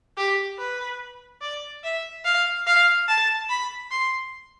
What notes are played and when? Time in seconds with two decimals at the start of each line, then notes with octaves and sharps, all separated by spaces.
0.17 G4
0.59 B4
1.41 D5
1.83 E5
2.25 F5
2.67 F5
3.08 A5
3.49 B5
3.91 C6